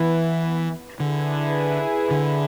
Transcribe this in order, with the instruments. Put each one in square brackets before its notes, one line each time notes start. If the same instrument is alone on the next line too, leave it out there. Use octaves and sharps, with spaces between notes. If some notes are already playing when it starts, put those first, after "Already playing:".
Already playing: [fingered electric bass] E3 [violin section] B3 E4 B4
[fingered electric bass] D3 [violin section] E4 G#4 B4
[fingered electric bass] D3